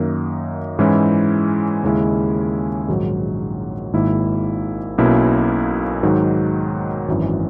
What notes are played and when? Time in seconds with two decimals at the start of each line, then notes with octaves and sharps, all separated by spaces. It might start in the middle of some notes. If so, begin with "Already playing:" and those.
Already playing: F#2 D#3 A#3 D#4
0.79 G#2 E3 G#3 C#4 E4
1.83 D#2 C#3 G#3 C#4 E4
2.88 A#1 G#2 D#3 F#3
3.93 G#1 G#2 D#3 A#3 E4
4.98 B1 B2 A#3 C#4 E4
6.03 G#2 D#3 F#3
7.08 G#1 F#2 E3